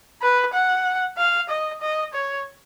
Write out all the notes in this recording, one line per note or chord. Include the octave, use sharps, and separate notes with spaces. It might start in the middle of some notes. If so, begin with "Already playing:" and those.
B4
F#5
F5
D#5
D#5
C#5